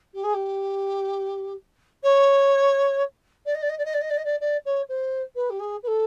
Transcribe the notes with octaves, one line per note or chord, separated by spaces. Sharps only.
G4
G#4
G4
C#5
D5
D#5
D5
D#5
D5
D#5
D5
D#5
D5
D#5
D5
D5
C#5
C5
B4
G4
G#4
B4
A4